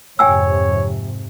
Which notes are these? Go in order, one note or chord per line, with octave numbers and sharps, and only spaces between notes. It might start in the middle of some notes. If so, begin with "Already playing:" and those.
F2 G#2 C3 C#5 G5 G#5 E6